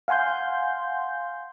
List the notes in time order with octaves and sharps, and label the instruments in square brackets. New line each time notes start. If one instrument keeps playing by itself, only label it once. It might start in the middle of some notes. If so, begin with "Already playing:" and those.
[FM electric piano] F5 F#5 G#5 C6 G6